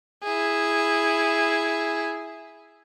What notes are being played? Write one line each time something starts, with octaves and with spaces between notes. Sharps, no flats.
E4 G#4